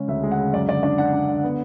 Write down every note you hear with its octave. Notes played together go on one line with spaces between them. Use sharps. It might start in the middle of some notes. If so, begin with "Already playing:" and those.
Already playing: C#3 G#3 C#4
D2 E5
G#3
F#5
C#3
F#2 D5
D3 D5
D4 D5
D4 F#5
D4
D3
B3